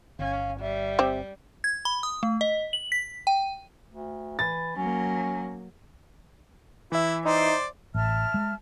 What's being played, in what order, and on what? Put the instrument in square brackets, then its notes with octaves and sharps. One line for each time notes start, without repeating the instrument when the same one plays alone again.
[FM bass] G1 [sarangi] C#4 [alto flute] F5
[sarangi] G3 [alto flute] E5
[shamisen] C4 G4
[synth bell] G#6
B5
D#6
A3
D#5
F#7
B6
G5
[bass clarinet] D2
[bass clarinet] E3 [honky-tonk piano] A6
[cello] F#3 A#3 [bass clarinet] C#4
[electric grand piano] E3 E5 [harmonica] E4
[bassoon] D#4 [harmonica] C5 D5
[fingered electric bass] A1 [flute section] E5 A5 F6
[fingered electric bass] G#3